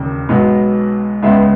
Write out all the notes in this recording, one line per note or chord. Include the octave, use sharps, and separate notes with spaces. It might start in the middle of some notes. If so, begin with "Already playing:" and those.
Already playing: E1 D#2 C#3
B1 B2 G#3 B3
C#2 C#3 G#3 B3 E5